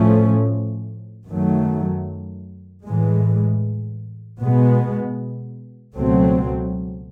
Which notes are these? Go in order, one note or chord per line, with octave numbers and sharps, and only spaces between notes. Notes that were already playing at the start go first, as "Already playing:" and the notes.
Already playing: A2 F3 A3 C#4
F#2 D#3 F#3 A3
A2 E3 G#3
B2 G#3 B3
C#2 B2 F#3 A3 C4